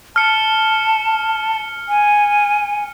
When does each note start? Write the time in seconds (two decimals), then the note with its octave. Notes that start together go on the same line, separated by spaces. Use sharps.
0.16 A5 F6 C#7
1.88 G#5